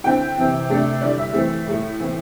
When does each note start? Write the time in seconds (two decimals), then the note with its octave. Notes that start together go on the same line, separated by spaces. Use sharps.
0.04 D3 C4 E4 G5
0.37 C3 E3 C4
0.69 C3 A3 D4
1.01 D3 G3 E4 D5
1.18 E5
1.33 E3 A3 C4 E4
1.67 A2 A3 E4
1.99 A2 E3 C4 E4